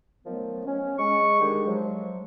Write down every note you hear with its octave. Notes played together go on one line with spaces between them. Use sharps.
D#3 F3 F#3 A3 B3
C#4
G#3 C#6
D3 D#3 G#3 D4 G4 G#4
F3 F#3 G#3